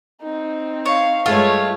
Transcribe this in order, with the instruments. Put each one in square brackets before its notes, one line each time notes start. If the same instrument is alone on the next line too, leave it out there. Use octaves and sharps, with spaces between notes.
[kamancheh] C4 D#4
[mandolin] C#5 [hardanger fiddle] F5
[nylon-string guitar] G2 G#3 [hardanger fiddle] A3 C#5 [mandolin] F4